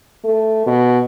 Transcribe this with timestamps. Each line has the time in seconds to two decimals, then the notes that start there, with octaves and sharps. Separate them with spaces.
0.25 A3
0.67 B2